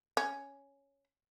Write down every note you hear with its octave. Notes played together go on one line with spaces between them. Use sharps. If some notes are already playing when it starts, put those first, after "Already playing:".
C#4